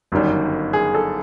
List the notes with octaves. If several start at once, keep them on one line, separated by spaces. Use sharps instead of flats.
G1 F#2 D#3 G3
G#4
A4